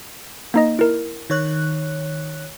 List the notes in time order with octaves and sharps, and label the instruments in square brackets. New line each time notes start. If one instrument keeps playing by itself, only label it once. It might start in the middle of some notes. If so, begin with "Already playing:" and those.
[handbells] A#3 D#4 D#5
E4 A#4
[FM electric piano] D#3 C#5 F#6